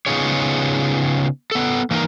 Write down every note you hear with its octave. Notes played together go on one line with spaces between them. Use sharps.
C#3 B3 D#4 F4 G#4 C#5
B3 A4
E3 A#3 D#4 A#4